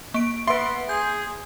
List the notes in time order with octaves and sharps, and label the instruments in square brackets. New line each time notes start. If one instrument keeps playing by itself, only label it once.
[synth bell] A#3 D7
[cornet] B3 [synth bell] B4 E5 [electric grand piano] C6
[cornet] G#4 [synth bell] G6